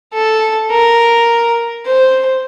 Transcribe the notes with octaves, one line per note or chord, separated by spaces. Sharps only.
A4
A#4
C5